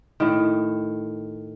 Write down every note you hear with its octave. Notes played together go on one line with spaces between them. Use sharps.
A2 D#3